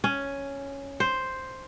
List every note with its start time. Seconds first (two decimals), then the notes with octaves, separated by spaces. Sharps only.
0.04 C#4
1.00 C5